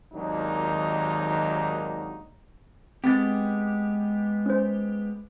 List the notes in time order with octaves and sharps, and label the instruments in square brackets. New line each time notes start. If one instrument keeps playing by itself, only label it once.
[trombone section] G#1 D#2 D#3 F#3 D4 D#4
[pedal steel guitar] G#3 B3 G4 [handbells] C4 A6
[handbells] C#4 C5